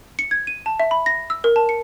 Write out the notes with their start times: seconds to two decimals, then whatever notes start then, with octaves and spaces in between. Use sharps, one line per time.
0.19 C#7
0.31 G#6
0.47 D#7
0.66 A5
0.80 E5
0.91 B5
1.06 A#6
1.30 E6
1.44 A#4
1.56 A5
1.69 C#7